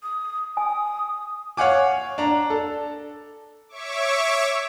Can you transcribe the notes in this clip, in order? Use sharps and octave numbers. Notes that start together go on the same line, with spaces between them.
D#6
G#5 D#6
C#5 F5 F#5 G#5 D6
D4 A#5
A4
C#5 E5 C#6 D6